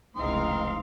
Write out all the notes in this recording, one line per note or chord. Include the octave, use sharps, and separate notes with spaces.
F1 C#2 E3 C4 D#4 F5 C6 D#6